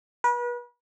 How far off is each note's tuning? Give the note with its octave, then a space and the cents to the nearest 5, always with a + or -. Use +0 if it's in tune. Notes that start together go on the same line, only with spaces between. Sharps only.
B4 -35